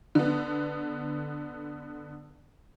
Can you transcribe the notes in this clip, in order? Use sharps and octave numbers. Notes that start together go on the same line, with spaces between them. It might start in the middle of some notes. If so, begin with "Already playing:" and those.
D3 B3